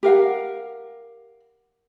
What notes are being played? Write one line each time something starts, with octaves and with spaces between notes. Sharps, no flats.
G4 A#4 F5 F#5